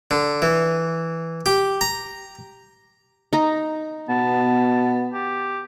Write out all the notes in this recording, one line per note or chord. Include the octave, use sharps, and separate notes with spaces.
D3
E3
G4
A#5
D#4 A#5
B2 B3 A5
G4